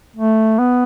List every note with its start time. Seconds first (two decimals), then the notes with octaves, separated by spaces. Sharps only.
0.17 A3
0.59 B3